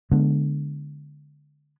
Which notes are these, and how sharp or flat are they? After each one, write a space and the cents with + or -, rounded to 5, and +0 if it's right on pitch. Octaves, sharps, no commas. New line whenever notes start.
D3 +0 G#3 +20 B3 +0